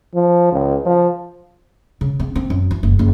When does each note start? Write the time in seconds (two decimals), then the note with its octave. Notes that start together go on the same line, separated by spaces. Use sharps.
0.15 F3
0.52 C#2
0.85 F3
2.01 C#3
2.20 C4
2.35 C4
2.50 F#2
2.71 E3
2.83 F#1
2.99 F#1